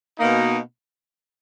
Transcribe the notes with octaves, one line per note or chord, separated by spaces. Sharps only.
B2 A#3 D#4